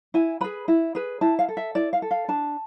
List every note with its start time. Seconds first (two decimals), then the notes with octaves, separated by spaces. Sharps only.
0.14 E4 G#5
0.41 G#4 B4 B5
0.68 E4
0.95 G#4 B4
1.21 E4 A5
1.39 F5
1.49 A4
1.57 E5
1.75 E4 D5
1.93 F5
2.02 A4
2.11 F5
2.28 D4 A5